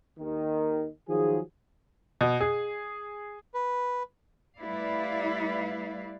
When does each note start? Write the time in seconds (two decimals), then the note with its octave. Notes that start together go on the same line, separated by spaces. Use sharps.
0.19 D#2 D#3
1.08 D#3 F3 F#3 G#4
2.21 B2
2.41 G#4
3.54 B4
4.58 G3 A3 E4 B4 D5 F5